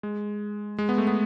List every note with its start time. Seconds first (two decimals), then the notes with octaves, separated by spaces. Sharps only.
0.03 G#3
0.78 G#3
0.89 B3
0.98 A3
1.07 B3